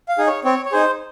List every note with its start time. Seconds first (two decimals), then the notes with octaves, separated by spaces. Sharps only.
0.09 F5
0.18 D#4 G#4
0.27 C#5
0.45 C4 C#5
0.65 C#5
0.72 D#4 G#4 C5